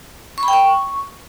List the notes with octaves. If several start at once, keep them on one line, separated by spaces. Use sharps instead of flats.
C#6
B5
G5
C#6